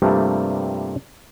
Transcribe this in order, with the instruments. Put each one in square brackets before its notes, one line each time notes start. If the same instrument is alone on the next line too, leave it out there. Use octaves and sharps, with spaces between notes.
[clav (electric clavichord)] G2 C3 F3 G3 A3 A#3